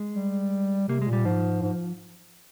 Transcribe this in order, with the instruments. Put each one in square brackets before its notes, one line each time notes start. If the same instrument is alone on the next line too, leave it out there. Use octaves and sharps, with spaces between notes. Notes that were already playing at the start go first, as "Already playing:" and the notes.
Already playing: [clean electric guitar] G#3
[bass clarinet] G3
[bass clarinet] C3 [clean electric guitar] A#3
[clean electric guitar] G#3
[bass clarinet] A#2 [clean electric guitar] G3
[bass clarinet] G#2 [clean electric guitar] F3
[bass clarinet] G#2